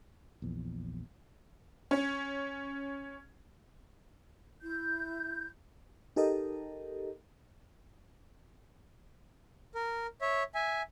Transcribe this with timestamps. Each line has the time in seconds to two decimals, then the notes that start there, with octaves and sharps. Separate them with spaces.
0.42 A#1 E2
1.91 C#4
4.62 E4 G6
6.16 D#4 G4 A4 A#4 D#5
9.75 A#4
10.21 C#5 E5
10.55 E5 G#5